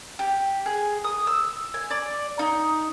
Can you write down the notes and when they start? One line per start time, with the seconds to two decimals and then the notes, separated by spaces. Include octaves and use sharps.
0.19 G4
0.66 G#4
1.04 D#6
1.27 E6
1.74 G#5
1.91 D5
2.39 D#4